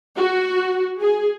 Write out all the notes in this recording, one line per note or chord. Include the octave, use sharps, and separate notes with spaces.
F#4
G#4